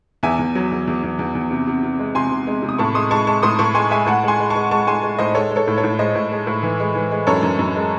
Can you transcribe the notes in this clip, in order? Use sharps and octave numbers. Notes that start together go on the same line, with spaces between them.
E2 E5 G#5
E2
F#3
E2
E2
E2
E2
E2
C3
C3
C3
G#3
C3 G#5 C6
C3
G#3
C3
D#6
A2 A5 C#6
G#3 C6 D#6
G#3 A5 C#6
G#3 A5 C#6
A2 C6 D#6
A2 A5 C#6
G#3 G#5 C6
G#3 E5 G#5
A2 F#5 A5
G#3 G#5 C6
G#3
A5 C#6
G#3
G#3 A5 C#6
G#3 G#5 C6
G#3
A2 C5 D#5
G#3 A4 C#5
G#3
A4 C#5
A2
A4 C#5
A2
G#3 C5 D#5
A2
G#3
A2
E3
G#3
E3
G#3
F#2 A4 C#5
F#2
F#2
G#3